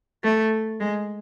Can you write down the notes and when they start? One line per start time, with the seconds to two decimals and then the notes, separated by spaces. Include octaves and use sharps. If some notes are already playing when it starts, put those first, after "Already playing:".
0.24 A3
0.80 G#3